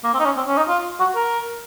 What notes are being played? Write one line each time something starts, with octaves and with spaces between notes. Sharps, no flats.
A#3
C4
D#4
C#4
C4
C#4
D#4
F4
F#4
A#4